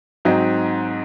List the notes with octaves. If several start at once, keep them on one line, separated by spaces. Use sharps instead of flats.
G#2 F#3 C4 D#4